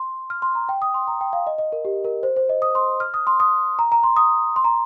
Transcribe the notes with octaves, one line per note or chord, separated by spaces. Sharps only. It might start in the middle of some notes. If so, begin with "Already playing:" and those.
Already playing: C6
F6
C6
A#5
G5
D#6
C6
A#5
G5
F5
D#5
D#5
A#4
G4
A#4
C5
C5
D#5
D#6
C6
F6
D#6
C6
D#6
A#5
A#5
C6
D#6
C6
A#5